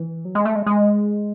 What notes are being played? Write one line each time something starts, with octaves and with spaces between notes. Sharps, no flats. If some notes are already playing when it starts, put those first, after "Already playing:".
Already playing: E3
F#3
G#3
A3
G#3
G#3